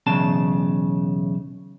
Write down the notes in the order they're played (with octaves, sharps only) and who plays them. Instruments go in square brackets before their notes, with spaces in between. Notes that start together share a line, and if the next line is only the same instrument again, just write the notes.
[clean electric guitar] B1 E2 C#3 A5